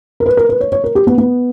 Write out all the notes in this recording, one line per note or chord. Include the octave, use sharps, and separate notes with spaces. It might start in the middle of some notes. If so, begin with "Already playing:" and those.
A#4
B4
A#4
B4
C#5
C#5
A#4
G4
B3
B3